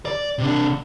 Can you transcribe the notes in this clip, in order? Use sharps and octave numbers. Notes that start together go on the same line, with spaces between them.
D5
C3 D4